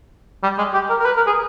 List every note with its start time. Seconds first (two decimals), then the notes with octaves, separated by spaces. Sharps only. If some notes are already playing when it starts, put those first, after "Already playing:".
0.43 G3
0.58 G#3
0.74 G4
0.90 A#4
1.00 A#4
1.06 B4
1.17 A#4
1.27 G#4